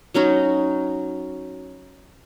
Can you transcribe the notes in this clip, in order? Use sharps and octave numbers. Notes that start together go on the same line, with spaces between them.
F#3 C#4 D#4 F#4